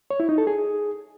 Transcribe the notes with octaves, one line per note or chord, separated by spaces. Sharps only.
C#5
E4
D#4
A4
G#4